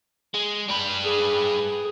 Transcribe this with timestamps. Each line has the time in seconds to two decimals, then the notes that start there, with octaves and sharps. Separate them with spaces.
0.34 G#3
0.68 G3 B4
1.04 G#4